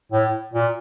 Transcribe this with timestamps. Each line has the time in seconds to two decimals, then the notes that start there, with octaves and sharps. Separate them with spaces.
0.12 A2
0.53 A#2